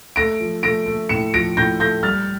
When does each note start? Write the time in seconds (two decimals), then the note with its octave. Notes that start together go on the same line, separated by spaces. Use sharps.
0.16 A3 A#6 D7
0.40 F3
0.63 A3 A#6 D7
0.86 A3
1.09 A2 C#7 E7
1.33 F3 A#6 D7
1.57 A2 G6 A#6
1.80 A3 G6 A#6
2.03 G3 F6 A6